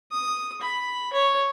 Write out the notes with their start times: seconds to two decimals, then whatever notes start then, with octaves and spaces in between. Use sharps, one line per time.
0.11 D#6
0.61 B5
1.13 C#5